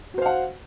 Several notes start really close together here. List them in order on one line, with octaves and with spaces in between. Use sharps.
F#4 C5 F5 F#5